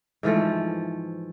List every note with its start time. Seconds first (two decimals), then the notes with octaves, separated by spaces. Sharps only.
0.23 G#2 E3 F3 A3